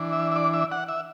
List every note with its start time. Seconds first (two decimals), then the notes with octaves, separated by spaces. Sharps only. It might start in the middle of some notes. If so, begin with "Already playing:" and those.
Already playing: E3 D4
0.12 E5
0.32 E5
0.36 D5
0.54 E5
0.72 F#5
0.88 E5